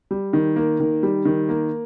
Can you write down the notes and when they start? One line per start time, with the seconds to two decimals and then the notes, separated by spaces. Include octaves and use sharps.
0.11 G3
0.33 D#3
0.56 A#3
0.80 D#3
1.03 G3
1.25 D#3
1.49 A#3